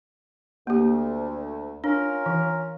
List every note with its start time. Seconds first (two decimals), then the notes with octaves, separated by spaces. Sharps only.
0.67 D2 A#3 G4
1.84 C#4 D4 F4 A#4
2.26 E3